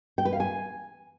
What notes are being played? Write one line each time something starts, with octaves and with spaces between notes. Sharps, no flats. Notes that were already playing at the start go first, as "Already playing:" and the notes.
G5
B4
F5
G#5